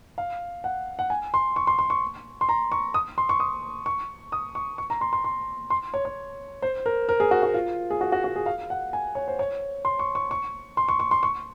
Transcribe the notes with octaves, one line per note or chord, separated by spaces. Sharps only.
F5
F#5
F#5
G#5
C6
C#6
C6
C6
C#6
C6
A#5
C#6
D#6
C6
C#6
D#6
C#6
D#6
C#6
C#6
A#5
C6
C6
C6
C6
C#5
C#5
C5
A#4
A#4
G#4
F#4
F#4
F4
G#4
F#4
F#4
F#4
G#4
F5
F#5
G#5
C#5
C5
C#5
C6
C#6
C#6
C#6
C6
C#6
C#6
C6
C#6